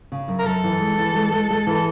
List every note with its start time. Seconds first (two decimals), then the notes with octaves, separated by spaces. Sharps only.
0.12 C#3
0.28 F#2
0.39 A#4
0.46 F#2 A4
0.64 E3
0.80 G#3
0.98 E3
1.15 G#3
1.32 G#3
1.50 G#3
1.67 E3
1.75 A4